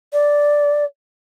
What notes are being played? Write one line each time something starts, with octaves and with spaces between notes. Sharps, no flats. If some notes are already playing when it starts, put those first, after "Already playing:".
D5